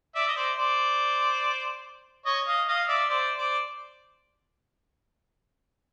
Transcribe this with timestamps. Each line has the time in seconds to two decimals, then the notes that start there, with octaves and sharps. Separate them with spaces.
0.15 D5 E5
0.28 D#5
0.36 C5 D5
0.57 C5 D5
2.26 C#5 D#5
2.47 D#5 F5
2.68 D#5 F5
2.88 D5 E5
3.09 C5 D5
3.38 C5 D5